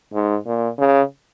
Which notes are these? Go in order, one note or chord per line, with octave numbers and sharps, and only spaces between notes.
G#2
A#2
C#3